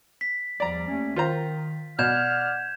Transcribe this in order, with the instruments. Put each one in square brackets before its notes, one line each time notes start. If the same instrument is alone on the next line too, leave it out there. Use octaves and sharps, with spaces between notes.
[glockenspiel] B6
[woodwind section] E2 F3 G3 [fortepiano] D5 A#5
[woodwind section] D#2 A3 C#4
[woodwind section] D#3 [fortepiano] F4 C5 A#5
[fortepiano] B2 [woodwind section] D5 F#5 F6 [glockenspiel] G6 G#6 E7